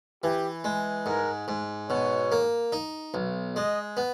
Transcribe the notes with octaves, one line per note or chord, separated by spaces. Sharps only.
E3 G4
G#3
G#2 A#4
G#2
B2 C#5
A#3
D#4
B1
G#3 D#5
B3